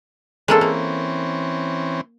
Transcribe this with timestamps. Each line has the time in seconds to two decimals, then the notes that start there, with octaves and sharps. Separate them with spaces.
0.48 E3 G#3 A#3 C4 C#4 A4
0.61 A#3